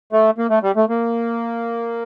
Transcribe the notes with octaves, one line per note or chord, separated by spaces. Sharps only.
A3
A#3
A3
G3
A3
A#3